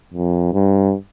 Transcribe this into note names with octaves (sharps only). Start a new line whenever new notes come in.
F2
G2